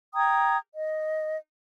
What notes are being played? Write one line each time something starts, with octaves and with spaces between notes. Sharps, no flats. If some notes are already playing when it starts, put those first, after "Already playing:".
G5 A#5 D#6 G#6
D#5